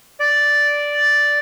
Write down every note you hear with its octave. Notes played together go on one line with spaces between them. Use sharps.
D5